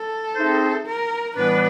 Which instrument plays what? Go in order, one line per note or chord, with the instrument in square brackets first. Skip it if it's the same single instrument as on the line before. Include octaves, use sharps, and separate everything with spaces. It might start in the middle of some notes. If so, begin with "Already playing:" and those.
Already playing: [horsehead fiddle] A4
[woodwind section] A3 C4 D#4 G#4 C5
[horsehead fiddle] A#4
[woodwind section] A2 E3 G3 B3 D4 [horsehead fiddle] B4